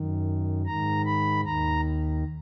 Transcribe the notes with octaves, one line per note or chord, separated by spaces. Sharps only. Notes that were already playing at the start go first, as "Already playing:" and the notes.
Already playing: F#2 D#3
G#2 D#3 A#5
B5
D#2 D#3 A#5